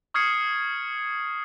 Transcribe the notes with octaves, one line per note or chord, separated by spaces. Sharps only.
C#6 D#6 F6 G#6 C7 C#7